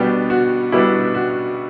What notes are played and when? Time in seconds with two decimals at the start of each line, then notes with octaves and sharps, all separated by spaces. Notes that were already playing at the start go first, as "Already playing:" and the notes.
Already playing: B2 G3 B3 D4 G4
0.30 F#4
0.72 B2 G3 B3 D4 E4
1.15 F#4